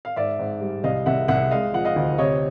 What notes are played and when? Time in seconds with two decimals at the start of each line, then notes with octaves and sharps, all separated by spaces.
0.05 F5
0.16 G#2 D5 E5
0.39 G#2
0.61 G3
0.84 C2 D#5 F5
1.06 C2 E5 F#5
1.28 C2 E5 F#5
1.51 G#3 D#5 F5
1.73 F3 F#5
1.85 D#5 F5
1.96 D2
2.18 C3 C#5 D#5